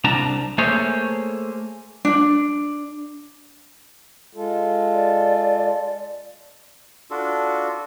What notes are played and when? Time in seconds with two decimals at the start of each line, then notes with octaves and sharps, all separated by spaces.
0.04 C2 D4 A5 A#5
0.58 A3 A#3 G#4 C5 C#5
2.05 D4
4.33 G#3 F4 A4
4.93 D5
7.11 D4 F4 F#4 A4